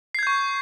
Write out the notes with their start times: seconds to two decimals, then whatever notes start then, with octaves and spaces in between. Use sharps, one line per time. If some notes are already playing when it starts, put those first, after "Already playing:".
0.15 C7
0.19 G#6
0.23 G6
0.27 C#6